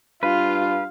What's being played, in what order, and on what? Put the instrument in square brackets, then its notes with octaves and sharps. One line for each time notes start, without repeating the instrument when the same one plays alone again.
[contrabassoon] G2 [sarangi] F4 [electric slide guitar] B4 [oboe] F5